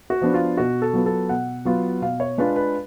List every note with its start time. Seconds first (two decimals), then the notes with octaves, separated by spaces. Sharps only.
0.10 F#4
0.21 F3 B3 D4
0.34 F4
0.57 B2 F#4
0.82 A4
0.93 F#3 B3 F4
1.06 A4
1.29 B2 F#5
1.65 F#3 B3 F4
2.01 B2 F5
2.20 C#5
2.38 G#3 D4 F4 B4
2.56 B4